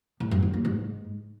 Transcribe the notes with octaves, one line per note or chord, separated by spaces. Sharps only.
A2
F#2
D#3
A#3
G#2